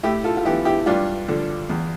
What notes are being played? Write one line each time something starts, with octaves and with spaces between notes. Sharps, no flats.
A2 E4 G4
F4 A4
F4
E3 B3 E4 G4
E4 G4
G2 D4 F4
D3 F3
E2